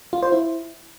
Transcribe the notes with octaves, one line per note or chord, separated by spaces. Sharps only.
F4
C5
E4